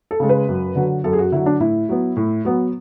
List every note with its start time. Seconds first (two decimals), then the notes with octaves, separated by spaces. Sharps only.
0.11 A4
0.20 C#3 G#3
0.29 B4
0.49 F#2
0.75 D3 F#3
1.04 F#2 A4
1.13 G#4
1.19 F#4
1.32 D3 F#3 E4
1.46 D4
1.60 A2 E4
1.89 F#3 B3
2.17 A2
2.45 F#3 B3